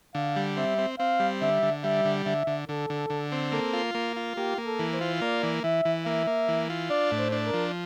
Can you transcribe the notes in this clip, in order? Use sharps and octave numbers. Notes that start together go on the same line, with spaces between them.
D3 F5
G3
C4 E5
C4
C4 F5
G3
D3 E5
D3
G3 E5
D3
D3 E5
D3
D3 A4
D3
D3
C4
A#3 A4
F4
A#3
F4
A#3 G4
A#3
A4
E3
C5
F4
A#3 D5
E3
E3 E5
E3
A#3 E5
A#3
E3
F4
D4 D5
A2
C5
D4
A#4
F3